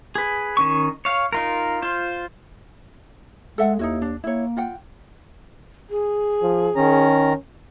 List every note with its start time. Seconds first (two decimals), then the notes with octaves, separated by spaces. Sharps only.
0.15 G#4 B4
0.57 D#3 C#4 C#6
1.05 C#5 F5
1.33 D#4 F4 A#4
1.82 F4 C5
3.58 G#3 A4 E5 F#5
3.79 D#2 D#4 E4 F#4
4.02 D4
4.24 A#3 E4 C#5
4.57 F4 F#5 G5
5.90 G#4
6.42 F3
6.76 D#3 C#4 A#5